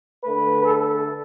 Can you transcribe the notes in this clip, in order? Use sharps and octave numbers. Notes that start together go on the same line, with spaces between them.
D3 A3 B4
A4